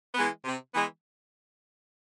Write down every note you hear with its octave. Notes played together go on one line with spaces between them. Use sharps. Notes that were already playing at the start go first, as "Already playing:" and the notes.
E3 G#3 B3
C3
E3 G#3 B3